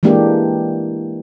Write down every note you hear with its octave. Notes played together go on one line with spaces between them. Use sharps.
E3 G#3 A#3 D4 G4